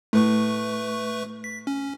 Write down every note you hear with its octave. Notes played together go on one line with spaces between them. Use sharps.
A2 A3 B4 C#6
B6
C#4